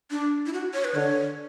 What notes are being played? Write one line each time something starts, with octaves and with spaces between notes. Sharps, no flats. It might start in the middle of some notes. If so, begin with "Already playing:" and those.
D4
E4
F#4
C#5
B4
D3 C#5